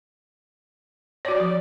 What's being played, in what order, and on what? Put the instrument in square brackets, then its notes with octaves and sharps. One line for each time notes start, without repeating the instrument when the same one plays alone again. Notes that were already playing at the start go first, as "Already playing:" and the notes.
[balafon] F#4 C#5 [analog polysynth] D5
[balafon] F3